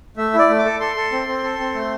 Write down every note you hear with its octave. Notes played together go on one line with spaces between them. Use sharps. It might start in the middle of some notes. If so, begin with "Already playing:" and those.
A3 E5
E4 D5
A3
D6
A4
A4 C6
A4
C4
C4
A4
C4
A3